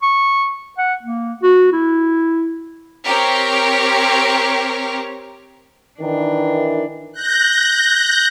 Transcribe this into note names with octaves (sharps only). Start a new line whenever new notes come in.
C#6
F#5
A#3
F#4
E4
C4 G4 A#4 C#5
D#3 E3 D4
F#6 G6 A#6